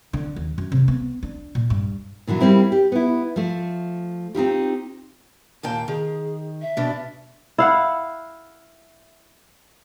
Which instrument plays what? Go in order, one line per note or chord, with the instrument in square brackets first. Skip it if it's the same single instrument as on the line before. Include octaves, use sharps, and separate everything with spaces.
[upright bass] D3
D#2
F#2
C3
B3
D4
A#2
G2
[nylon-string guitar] A#2 D3 E3 F#3
G3 A#3 C4 E4
G4
B3 E4
F3 A3
C4 D#4 F4 G4
[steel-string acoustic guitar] D#2 A#2 G5 [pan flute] A5
[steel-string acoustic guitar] D#3 [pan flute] G#4
[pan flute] E5
[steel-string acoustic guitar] B2 D4
[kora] E4 F5 F#5